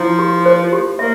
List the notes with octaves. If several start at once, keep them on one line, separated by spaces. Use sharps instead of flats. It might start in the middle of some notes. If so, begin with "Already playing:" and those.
Already playing: F3 E4
G4
C5
G4
A#3 E5